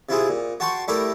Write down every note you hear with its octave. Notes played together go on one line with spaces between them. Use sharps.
C3 E4 F4 G#4
A#2
F#4 G5 A5 C6 C#6
G3 A3 E4 G4 A#4